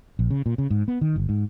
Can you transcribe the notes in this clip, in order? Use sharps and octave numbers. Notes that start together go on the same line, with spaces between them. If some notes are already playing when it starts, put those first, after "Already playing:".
A#1
C#3
A#2
C#3
G#2
B3
D#3
G1
G#2